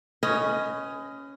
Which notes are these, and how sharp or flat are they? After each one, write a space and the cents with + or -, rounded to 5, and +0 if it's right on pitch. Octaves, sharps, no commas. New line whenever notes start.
C#4 +0 B4 +35 D#5 +10